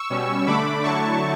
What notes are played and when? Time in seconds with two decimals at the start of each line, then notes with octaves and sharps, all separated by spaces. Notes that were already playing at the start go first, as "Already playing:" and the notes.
Already playing: C#6 E6
0.10 B2 G3 C#4
0.47 D3 A3 D4 B5 D6
0.83 D3 F#3 A3 E4 A5 C#6